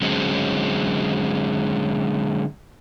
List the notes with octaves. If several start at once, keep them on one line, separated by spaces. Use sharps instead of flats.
D3 F#3 G#3 C4 C#4